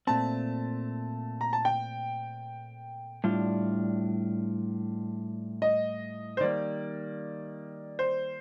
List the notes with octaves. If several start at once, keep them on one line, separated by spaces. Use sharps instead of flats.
A#2 A3 C4 A5
A#5
A5
G5
A2 G3 D4 F4
D#5
C5
D#3 G3 A#3 D5
C5